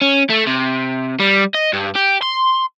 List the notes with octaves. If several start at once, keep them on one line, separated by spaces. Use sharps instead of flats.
C#4
A3
C3
G3
D#5
G2
G4
C6